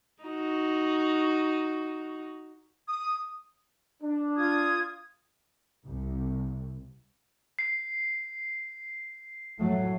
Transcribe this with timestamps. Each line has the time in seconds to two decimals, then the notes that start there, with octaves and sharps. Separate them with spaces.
0.24 D#4 F#4
2.88 D#6
4.02 D4
4.37 F4 D#6 G#6
5.85 C2
7.59 C7
9.58 A2 F#3 A3